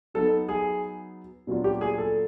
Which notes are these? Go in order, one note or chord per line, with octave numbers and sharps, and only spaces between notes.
F#3 B3 D#4 A4
G#4
A#2 F#3 B3 D4 F4
G4
G#4
A4